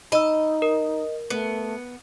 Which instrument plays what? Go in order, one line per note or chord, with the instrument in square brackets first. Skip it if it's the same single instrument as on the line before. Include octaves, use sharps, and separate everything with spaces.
[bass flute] D#4 [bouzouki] D#5 [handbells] B5 E6
[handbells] A#4
[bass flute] A3 [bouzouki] B3